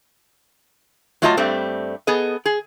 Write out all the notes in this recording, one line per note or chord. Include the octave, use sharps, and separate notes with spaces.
F#3 A3 D4 F4 D#5 A5
G2 G3 A3 C4
B3 G#4 A4 D#5
G#4